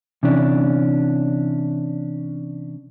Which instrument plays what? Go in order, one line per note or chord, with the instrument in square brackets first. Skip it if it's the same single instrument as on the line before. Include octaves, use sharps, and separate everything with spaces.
[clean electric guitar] C3 E3 C#4 D4